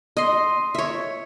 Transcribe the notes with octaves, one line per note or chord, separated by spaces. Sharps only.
D#5 C6
C#5 E5